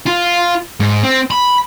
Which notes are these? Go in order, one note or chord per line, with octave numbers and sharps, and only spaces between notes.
F4
G#2
C4
B5